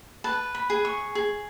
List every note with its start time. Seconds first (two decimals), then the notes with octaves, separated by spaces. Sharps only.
0.24 B4 A5
0.55 B5
0.70 G#4
0.85 C#6
1.15 G#4